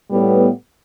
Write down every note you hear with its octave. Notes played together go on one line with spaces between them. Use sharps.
A2 G3 B3